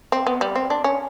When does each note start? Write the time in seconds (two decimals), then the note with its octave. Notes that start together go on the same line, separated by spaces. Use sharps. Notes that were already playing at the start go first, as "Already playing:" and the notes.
0.12 C4
0.27 B3
0.41 G3
0.55 C4
0.70 D4
0.84 C#4